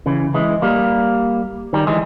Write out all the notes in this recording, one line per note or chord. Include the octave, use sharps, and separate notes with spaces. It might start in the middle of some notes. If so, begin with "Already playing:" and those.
C#3 E3
E3 G#3
G3 A#3
D#3 G3
E3 G#3